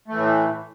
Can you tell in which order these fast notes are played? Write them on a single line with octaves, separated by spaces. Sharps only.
A3 E3 A2